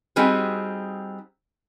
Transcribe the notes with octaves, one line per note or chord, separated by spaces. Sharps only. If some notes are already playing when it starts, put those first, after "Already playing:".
G3 C4 D#4 F#4 G#4